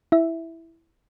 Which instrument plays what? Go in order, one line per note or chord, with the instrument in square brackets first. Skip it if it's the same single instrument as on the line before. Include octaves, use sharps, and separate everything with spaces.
[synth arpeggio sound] E4 E5